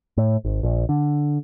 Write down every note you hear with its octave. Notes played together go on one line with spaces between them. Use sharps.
A2
G#1
A#1
D3